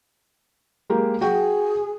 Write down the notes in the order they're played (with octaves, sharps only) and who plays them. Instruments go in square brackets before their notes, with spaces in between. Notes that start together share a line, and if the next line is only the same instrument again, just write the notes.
[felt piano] G#3 A#3 G4
[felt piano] F#4 G5 [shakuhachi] G#4